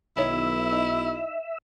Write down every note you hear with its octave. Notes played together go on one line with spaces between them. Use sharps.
B1 D#3 E4 C#5 E5
D#4